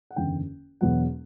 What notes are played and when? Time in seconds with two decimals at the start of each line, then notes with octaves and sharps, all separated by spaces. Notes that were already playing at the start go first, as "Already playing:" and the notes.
0.11 F#5
0.16 F#1 E2 D3 G5
0.81 E1 E2 B2 F#3 F#5